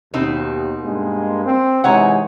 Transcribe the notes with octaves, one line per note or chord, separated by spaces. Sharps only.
D#2 B2 C4 D#4
G2 G#3 A#3
C4
C3 E3 G#3 D#4 C#5 F#5